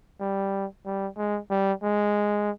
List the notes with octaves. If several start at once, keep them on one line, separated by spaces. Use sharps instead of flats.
G3
G3
G#3
G3
G#3